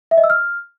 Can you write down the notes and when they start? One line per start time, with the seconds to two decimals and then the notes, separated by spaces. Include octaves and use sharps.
0.11 E5
0.17 D#5
0.24 E6
0.30 F6